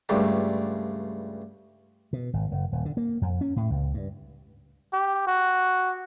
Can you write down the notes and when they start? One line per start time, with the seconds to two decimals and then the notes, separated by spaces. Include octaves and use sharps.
0.09 C#2 G2 A3 F4 D5 G5
2.13 B2
2.33 G#1
2.51 F#1
2.72 D#1
2.85 D3
2.97 A#3
3.21 F2
3.41 C#4
3.56 A2
3.70 C#2
3.94 G2
4.93 G4
5.27 F#4